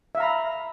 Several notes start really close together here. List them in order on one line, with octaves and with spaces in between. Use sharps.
E5 F5 A#5 B5